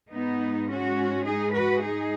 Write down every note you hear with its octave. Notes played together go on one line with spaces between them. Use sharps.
G#2 G#3 B3 D#4
C#4 F#4
D#4 G#4
F#4 B4
D#4 G#4